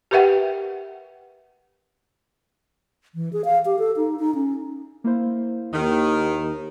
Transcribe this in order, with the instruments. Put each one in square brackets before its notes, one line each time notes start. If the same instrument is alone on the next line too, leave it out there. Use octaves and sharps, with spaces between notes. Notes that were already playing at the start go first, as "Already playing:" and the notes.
[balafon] G4 A#4 B4 E5 F#5 G5
[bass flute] E3
G#4
F5
G4
A4
D#4
D#4
C#4
[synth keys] A#3 E4 C5
[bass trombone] D#2 [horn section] D#3